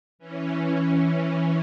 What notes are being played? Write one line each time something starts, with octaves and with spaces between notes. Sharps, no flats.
E3 C#4